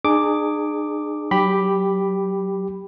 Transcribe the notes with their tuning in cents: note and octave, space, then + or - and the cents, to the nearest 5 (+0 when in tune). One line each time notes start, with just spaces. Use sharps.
D4 +45 G#4 +0 D6 +0
F#3 +15 G4 +0 B5 +0